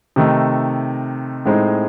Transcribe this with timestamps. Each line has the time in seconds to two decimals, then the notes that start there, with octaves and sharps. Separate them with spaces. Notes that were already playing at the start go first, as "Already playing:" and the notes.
0.16 C3 D#3 A3 D#4
1.46 A2 G#3 C4 D#4